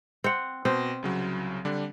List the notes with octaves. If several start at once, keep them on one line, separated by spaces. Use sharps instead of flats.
C4 F#5
B2 C4
C2 C#3 F#3
D3 G3 D4